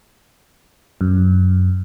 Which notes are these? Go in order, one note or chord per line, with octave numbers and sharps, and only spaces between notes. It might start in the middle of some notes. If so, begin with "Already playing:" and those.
F#2